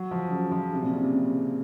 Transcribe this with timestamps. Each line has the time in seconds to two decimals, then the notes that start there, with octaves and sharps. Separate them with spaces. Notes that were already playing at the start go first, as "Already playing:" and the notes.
Already playing: F#3
0.11 F3
0.31 C#3
0.52 F3
0.73 C3
0.83 A#2
0.93 C#3
1.03 C3